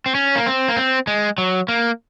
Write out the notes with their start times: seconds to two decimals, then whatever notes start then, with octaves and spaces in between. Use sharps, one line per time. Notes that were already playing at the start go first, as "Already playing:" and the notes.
0.06 C4
0.15 C#4
0.35 A#3
0.46 C4
0.68 A#3
0.77 C4
1.07 G#3
1.38 F#3
1.68 A#3